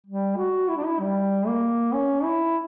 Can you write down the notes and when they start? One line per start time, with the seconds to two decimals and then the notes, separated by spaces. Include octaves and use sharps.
0.06 G3
0.37 F#4
0.68 E4
0.77 D4
0.86 E4
1.00 G3
1.47 A#3
1.93 C#4
2.24 E4